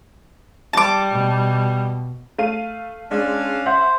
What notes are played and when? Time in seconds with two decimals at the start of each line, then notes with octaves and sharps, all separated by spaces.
0.73 G3 A5 D6
1.12 B2
2.39 A3 F5 D#7
3.11 G#3 C#4 D4 F5
3.66 C5 E5 F#5